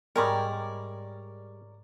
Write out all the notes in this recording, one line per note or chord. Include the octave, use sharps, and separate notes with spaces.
G#2 G3 G#3 A#4 C#5 D5 A#5 B5